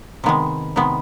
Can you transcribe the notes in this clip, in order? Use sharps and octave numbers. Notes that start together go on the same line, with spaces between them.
C3 D#3 G#3 B3
C3 D#3 G#3 B3